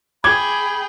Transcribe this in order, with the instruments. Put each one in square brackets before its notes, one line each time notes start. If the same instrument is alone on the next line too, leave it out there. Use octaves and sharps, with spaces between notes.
[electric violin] G#4 G5 [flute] B5 [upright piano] D6 G#6